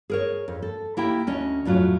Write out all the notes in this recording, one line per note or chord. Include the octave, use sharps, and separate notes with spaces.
G#4 A#4 C#5
F2
A4
A#3 E4 G4 G5
D2 C#4 D#5
F2 A2 F#3 F4